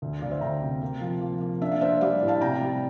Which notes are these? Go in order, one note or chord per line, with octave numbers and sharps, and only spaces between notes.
D2
D2 D5 F5
C5 E5
D2 G5 A#5
C3
A#3
F3
A#3
A#3
D4 E5
F5
D4 C5 E5
G3 D5 F5
A2
F5 A5
C3 G5 A#5
G3